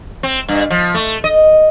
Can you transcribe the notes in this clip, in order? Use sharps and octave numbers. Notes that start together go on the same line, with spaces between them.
C4
G2
F3
A3
D#5